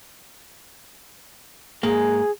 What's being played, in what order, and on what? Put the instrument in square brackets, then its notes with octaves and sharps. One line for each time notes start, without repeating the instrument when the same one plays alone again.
[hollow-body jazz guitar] G#2 A#3 [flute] G#4